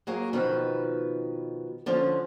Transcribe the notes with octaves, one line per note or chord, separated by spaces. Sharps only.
F#3 A#3 G#4 C#5
B2 D#3 F3 B4
D3 F3 C#4